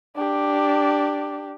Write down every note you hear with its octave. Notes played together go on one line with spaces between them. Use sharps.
D4 G4